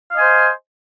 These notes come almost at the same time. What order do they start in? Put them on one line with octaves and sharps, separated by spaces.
F5 D#5 G#5 C5